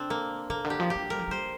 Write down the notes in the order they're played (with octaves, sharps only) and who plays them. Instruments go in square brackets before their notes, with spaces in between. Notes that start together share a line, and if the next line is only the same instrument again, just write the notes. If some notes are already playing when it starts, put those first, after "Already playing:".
Already playing: [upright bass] C3 [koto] C4 D4
[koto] A#3
[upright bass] C3 [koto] A#3
[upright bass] D3
[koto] G4
[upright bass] F3
[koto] G4
[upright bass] G#3
[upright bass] G3 [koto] A#4
[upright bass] F3
[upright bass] G3 [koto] C5